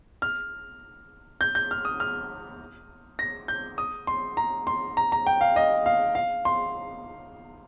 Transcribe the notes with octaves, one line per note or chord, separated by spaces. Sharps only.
F6
G6
G6
F6
D#6
F6
A#6
G6
D#6
C6
A#5
C6
A#5
A#5
G5
F5
D#5
F5
F5
C6